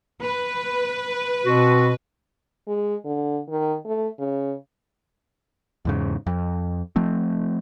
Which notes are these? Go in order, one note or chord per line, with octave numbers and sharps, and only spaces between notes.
B4
B2 C4 F#4
G#3
D3
D#3
A3
C#3
E2 G#2 C#3
F2
F3 A3 C4